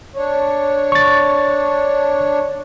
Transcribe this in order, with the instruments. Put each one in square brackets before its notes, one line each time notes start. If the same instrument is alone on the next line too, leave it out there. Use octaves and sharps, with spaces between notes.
[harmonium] D4 C#5
[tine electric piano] C#6 A6